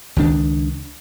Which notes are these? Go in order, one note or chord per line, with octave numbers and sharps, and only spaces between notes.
C#2 D#3 D4